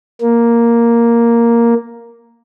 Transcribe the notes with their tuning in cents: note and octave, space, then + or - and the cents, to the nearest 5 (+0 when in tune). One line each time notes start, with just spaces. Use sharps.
A#3 +0